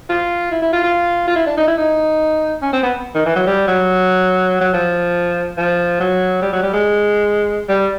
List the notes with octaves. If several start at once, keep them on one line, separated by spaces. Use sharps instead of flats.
F4
E4
E4
F4
F4
F4
E4
D4
D#4
E4
D#4
C#4
C4
B3
D#3
E3
F#3
G3
F#3
F#3
F3
F3
F#3
G3
F#3
G3
G#3
G3